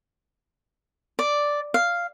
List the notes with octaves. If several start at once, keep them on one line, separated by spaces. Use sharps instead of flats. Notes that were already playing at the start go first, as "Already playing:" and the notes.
D5
F5